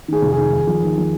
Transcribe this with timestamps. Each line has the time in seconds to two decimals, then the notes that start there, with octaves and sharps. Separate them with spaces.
0.08 D#3 G#4
0.22 F1
0.32 G#4
0.38 D#3
0.52 D#2
0.67 F3
0.82 D#2
0.97 F3